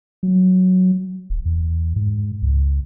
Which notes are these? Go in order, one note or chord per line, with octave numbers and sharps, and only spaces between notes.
F#3
D#1
E2
G#2
C#2